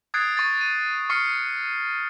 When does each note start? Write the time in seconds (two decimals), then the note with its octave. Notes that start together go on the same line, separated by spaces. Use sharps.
0.14 D#6 F#6 G#6 A6 C7 D7
0.37 C#6 A6
0.61 D#7
1.10 C#6 F6 C7 C#7